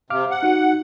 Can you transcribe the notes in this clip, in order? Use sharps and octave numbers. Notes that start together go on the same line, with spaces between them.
C3 F5 D6 F6
F#5
D#4 F#4